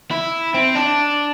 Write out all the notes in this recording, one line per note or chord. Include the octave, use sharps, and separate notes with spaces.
E4
C4
D4